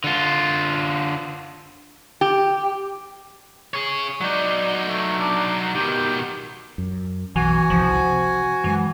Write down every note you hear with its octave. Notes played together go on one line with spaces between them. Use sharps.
D3 F4
G4
G#4 C#5
F#3 D#4 D5
A3
D4
B2 D#3 G4
F#2
B1 E3 F#4 G#5
G1 C2 F3
C3
F#2 E3 G#3